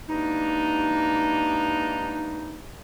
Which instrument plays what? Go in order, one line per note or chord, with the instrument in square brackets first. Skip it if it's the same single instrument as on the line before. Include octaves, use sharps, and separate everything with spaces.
[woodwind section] E3 G3 G#3 A#3 D4 D#4